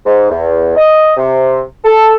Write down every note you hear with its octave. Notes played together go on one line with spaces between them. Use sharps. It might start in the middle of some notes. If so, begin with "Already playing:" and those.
G#2
E2
D#5
C3
A4